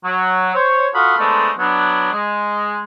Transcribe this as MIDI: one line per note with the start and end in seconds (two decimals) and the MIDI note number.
0.04 0.51 54
0.54 0.87 72
0.54 0.87 73
0.94 1.17 65
0.94 1.17 66
0.94 1.17 69
0.94 1.17 83
0.94 1.17 87
0.94 1.17 89
1.18 1.50 56
1.18 1.50 57
1.18 1.50 59
1.18 1.50 62
1.18 1.50 69
1.18 1.50 72
1.58 2.07 54
1.58 2.07 59
1.58 2.07 62
2.12 2.84 56